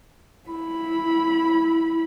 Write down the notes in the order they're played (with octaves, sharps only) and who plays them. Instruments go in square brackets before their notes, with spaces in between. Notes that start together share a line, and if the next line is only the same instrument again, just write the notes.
[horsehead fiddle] E4 B5